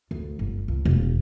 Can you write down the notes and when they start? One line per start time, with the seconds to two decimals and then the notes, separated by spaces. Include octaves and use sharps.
0.11 D2
0.39 G1
0.68 C#2
0.85 E1